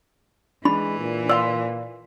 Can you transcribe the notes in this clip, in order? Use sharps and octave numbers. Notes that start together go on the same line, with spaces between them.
E3 G#3 D4 B5
A#2
D5 F5 C6 E6